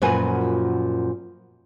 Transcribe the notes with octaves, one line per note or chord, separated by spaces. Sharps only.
F#2 A#2 F3 F#4 B4 G#5